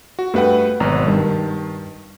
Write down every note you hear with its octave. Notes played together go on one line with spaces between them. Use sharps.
F#4
G2 A3 B4 F#5 G5
G#1 B2 F#3 A#5
G2 D#3